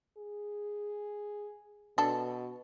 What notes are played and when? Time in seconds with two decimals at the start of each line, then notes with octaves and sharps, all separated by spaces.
0.18 G#4
1.98 B2 D4 A4